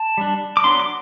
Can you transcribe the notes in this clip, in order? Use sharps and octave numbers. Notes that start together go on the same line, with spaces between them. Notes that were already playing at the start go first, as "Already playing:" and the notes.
Already playing: A5
G3 D4
D6
F#3 B3 D4 C6
D6